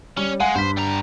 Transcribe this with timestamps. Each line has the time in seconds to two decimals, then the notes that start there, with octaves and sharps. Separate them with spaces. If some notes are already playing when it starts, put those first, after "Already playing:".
0.17 G3 C#4
0.40 G#3 F5 F#5 G#5
0.55 G2 C5 B6
0.77 G3 A#5